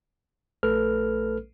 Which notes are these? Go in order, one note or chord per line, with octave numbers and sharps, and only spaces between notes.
A#1 A3 A4 B4 F6